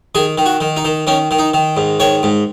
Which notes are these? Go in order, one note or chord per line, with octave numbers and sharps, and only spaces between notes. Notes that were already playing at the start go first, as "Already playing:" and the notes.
D#3 G#4
D#3
F#4
D#3
D#4
D#3
D#3 C#4
D#3
D#4
D#3
G#2
D#3 C#5
G#2